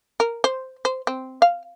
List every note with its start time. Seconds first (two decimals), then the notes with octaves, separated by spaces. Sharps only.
0.20 A#4
0.44 C5
0.85 C5
1.07 C4
1.42 F5